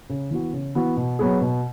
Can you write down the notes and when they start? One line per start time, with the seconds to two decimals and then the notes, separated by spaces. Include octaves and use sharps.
0.09 C#3
0.31 E3 B3 F#4
0.53 C#3
0.75 E3 B3 F#4
0.97 B2
1.19 F#3 B3 G#4
1.41 B2